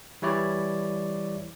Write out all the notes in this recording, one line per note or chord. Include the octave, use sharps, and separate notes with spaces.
E3 G3 E4 C#5 D5